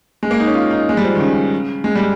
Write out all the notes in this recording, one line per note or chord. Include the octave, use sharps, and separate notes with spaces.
G#3
A#3
D#4
C#4
F4
D#4
G#3
G3
F3
D#3
C#3
G#3
G3